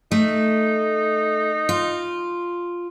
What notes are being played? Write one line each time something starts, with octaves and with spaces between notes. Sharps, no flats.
A3 D#4
F4